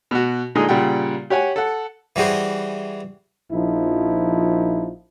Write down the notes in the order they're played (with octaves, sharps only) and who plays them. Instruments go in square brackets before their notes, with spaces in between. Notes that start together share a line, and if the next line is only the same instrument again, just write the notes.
[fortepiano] B2 F#4
A#2 D3 G#3 D#4 G#4
A#2 C#3 G3 F#5 G5
G4 C#5 F#5 G#5
A4 F#5
[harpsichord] E3 G3 F#4 G#4 C5
[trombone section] A#1 F3 D#4 E4